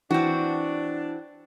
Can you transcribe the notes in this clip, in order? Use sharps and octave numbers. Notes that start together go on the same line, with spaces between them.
E3 C4 D4 F#4